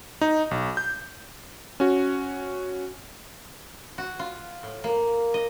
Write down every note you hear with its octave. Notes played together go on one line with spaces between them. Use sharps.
D#4
B1
G6
C#4 F#4
F#4
F4
A2
A#3
D#5